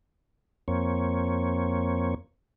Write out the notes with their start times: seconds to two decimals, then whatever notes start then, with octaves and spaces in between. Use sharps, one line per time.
0.68 F2 A#3 C4 C#5